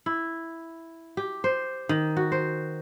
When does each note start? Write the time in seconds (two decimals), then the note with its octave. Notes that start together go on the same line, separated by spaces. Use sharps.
0.06 E4
1.17 G4
1.44 C5
1.89 D#3
2.17 F#4
2.32 C5